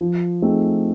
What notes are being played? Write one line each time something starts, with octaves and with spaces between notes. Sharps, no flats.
F3
A3 C4 D#4 G#4